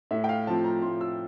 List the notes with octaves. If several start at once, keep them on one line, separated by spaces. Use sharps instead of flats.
A2 E5
G5
F5
F3 C4 F4 A5
A#5
A2 C6
E6